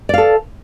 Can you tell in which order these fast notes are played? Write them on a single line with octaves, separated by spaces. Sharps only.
D5 F5 A4